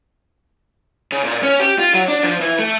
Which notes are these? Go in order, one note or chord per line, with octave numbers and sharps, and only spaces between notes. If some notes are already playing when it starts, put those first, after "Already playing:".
C#3
A#2
C#4
G4
F4
F#3
D4
F3
E3
A3